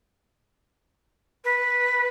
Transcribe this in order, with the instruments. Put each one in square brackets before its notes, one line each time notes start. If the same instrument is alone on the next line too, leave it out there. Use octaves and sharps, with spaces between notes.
[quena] B4